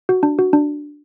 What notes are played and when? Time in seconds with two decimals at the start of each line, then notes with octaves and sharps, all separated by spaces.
0.09 F#4
0.23 D4
0.39 F#4
0.53 D4